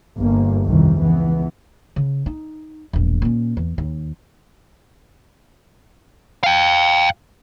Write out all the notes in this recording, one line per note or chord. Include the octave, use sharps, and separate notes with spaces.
G1 A#3
C2 F2 D#3 E3
C#2 E3 B3
C#3
D#4
E1 A#1
A#2 C#4
E2
D#2
F5 G5